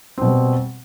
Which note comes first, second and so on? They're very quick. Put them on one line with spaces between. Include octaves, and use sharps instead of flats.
C4 B2 G3